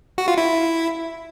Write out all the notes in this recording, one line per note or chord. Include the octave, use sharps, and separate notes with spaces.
F#4
F4
E4